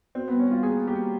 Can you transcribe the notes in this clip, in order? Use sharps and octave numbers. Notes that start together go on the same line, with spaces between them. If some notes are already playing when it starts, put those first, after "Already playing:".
C4 F#4
G3 B3
C#4
G3 F4
A#3 G#4
A#3
G4
A#3